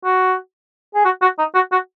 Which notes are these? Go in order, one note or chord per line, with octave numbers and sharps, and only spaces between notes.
F#4
G#4
F#4
F#4
D#4
F#4
F#4